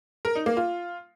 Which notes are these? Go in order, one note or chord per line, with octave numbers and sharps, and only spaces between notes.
A#4
D#4
A#3
F4